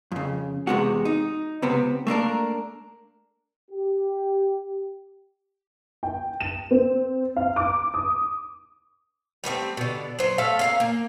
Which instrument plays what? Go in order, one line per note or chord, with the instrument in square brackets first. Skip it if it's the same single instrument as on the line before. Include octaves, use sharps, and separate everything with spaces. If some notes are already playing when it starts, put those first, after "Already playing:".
[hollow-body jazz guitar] F2 C#3
E2 C3 G#3 F#4
D#4
C#2 C3 B3 C4
A3 A#3 D4 A#4
[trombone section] G4
[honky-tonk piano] G5
E7
C4
F5
D6
D#6
[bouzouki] G3 A3 B3 C4
B2 D3
F#3 C5
A3 A4 E5 F5
C#4 F5 A#5
A#3